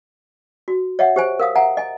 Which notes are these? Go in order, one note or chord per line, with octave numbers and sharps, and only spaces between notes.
F#4
C#5 D#5 E5 F#5
G4 C5 G#5
A#4 F5 D#6
E5 F#5 G#5 A#5
D#5 G#5